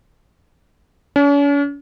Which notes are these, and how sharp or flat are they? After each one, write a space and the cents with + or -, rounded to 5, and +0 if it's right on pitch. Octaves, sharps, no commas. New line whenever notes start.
C#4 +45